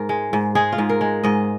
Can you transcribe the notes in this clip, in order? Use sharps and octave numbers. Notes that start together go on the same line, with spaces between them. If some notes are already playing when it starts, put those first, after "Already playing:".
Already playing: G#2 A#4
G#3
G#2
G#3 G#4
F4
G#2
A#4
G#3
G#2 D#5